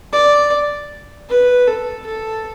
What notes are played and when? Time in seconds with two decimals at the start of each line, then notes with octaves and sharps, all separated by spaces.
0.13 D5
1.29 B4
1.67 A4
2.06 A4